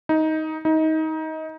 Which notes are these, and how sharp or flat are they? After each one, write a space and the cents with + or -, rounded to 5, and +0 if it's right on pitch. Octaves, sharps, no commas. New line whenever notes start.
D#4 +15
D#4 +25